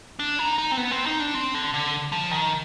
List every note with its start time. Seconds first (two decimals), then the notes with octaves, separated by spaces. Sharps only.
0.19 D4
0.39 D#4
0.58 D#4
0.72 C4
0.77 B3
0.91 C4
1.06 D#4
1.20 D4
1.35 C4
1.54 D3
1.74 D3
2.12 F3
2.31 D#3